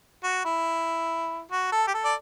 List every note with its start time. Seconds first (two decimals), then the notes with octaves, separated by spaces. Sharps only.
0.24 F#4
0.45 E4
1.51 F#4
1.72 A4
1.87 G4
1.94 A4
2.05 D5